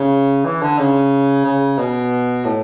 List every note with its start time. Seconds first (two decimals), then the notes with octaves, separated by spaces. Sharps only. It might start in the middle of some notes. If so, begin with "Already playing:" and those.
Already playing: C#3
0.45 E3
0.62 D3
0.78 C#3
1.45 C#3
1.78 B2
2.45 A2